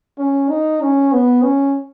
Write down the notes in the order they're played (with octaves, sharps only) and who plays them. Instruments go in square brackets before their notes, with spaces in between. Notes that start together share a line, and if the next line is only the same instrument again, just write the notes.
[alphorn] C#4
D#4
C#4
B3
C#4